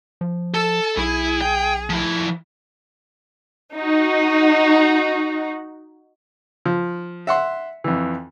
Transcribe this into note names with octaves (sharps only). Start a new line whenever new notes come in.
F3
A4 A5
B1 E4 G#4
G5
F3 E4
D#4 F#4
F3
E5 F#5 C6
F2 E3